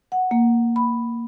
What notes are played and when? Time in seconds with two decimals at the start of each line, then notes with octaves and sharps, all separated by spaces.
0.12 F#5
0.31 A#3
0.76 B5